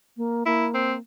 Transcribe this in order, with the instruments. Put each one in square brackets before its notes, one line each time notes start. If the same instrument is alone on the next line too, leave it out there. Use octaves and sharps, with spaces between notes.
[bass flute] A#3
[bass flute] A#3 [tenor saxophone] E4
[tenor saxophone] C4